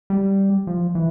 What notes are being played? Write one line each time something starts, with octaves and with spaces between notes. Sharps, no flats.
G3
F3
E3